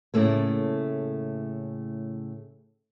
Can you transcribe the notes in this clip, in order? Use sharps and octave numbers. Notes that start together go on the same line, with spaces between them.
A2 C#3 A3 A#3